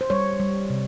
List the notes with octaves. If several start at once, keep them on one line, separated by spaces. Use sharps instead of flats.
C5
G3 C#5
G3
C3